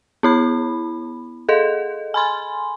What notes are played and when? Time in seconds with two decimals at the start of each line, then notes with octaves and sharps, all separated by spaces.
0.23 B3 E4 B5
1.49 G#4 A4 D#5
2.14 G#5 B5 C6